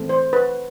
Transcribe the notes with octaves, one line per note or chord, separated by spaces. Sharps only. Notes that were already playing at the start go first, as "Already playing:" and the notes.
Already playing: E3 A3 C4
C5
B4